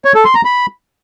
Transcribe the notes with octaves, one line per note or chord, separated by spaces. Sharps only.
C#5
A4
C6
A#5
B5